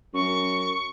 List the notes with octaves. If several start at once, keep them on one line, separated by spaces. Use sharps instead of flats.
F#2 C#6